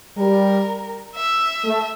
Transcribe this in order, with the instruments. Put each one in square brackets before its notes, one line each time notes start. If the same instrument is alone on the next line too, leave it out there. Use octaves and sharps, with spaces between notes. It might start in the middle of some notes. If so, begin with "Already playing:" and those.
[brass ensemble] G3 [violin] A#4
[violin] E5
[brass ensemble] A3